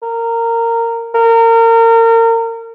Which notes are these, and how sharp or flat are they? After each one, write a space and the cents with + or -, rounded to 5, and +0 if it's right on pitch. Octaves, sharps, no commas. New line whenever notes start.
A#4 -15
A#4 -30